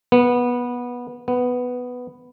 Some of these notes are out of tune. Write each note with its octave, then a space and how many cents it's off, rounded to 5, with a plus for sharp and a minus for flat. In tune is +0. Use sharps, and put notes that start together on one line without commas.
B3 -15
B3 +5